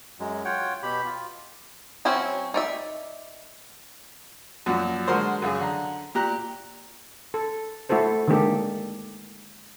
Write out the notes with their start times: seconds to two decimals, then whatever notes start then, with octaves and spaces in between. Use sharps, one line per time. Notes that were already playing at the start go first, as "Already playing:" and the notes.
0.20 F#2 F#3 G#3
0.45 F4 C#5 F#5 G5
0.83 B2 G4 B5
1.05 F4
2.05 F#3 C4 C#4 E4 F#4
2.54 D#4 D5 E5
4.66 F#2 A#2 F3 F#4
5.08 D3 G#3 F#4 A#4 C5
5.42 F#2 C#3 G#4
5.60 D3 A#5
6.15 A#2 G4 A#5 F#6
7.34 A4
7.89 A3 E4 F#4 A4 C5
8.28 D3 D#3 G#3 A#3 G4 A4